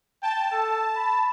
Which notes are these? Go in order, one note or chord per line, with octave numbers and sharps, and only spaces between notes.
G5 A5
A4
B5